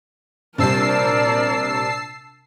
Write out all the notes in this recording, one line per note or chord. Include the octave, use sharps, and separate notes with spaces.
A#1 C3 G3 A#4 D5 A5 E6 C7